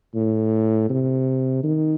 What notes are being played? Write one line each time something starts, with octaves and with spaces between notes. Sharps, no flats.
A2
C3
D#3